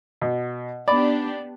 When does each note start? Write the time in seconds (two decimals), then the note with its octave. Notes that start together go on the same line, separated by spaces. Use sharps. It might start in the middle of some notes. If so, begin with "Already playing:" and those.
0.22 B2
0.88 B3 D4 D#4 G4 D5 B5